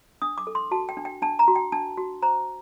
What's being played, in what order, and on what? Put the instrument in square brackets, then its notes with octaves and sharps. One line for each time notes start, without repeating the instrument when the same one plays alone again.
[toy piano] D4 D#6
D6
A4
C6
F#4 A5
G5
D4
G5
D4 A5
A#5
F#4
G5
D4 A5
F#4
C5 A#5